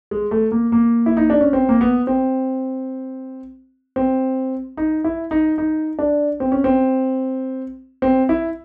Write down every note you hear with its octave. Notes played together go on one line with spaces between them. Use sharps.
G#3
A3
A#3
A#3
E4
D#4
D4
C#4
C4
A#3
B3
C4
C4
D#4
E4
D#4
D#4
D4
C4
C#4
C4
C4
E4